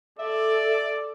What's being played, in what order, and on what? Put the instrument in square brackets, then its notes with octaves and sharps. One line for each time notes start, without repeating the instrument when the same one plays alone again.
[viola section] A4 [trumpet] D5 [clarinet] E5